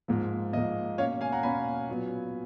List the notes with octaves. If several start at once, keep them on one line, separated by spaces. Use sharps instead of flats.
G#2 F3 A#3
G#2 F3 A#3 D#5
B2 A#3 C#4 C#5 F5
F5 G#5
F#5 A#5
B2 A#3 C#4 G#5 B5
A#2 F#3 B3